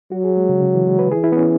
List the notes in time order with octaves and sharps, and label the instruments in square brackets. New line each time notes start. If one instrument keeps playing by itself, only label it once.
[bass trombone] F#3 [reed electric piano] F#4
[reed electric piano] G#4
G#3
C#3
C#3
E3
G#3
B4
[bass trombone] E3 [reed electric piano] G#4
[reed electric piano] E4
B3
C#4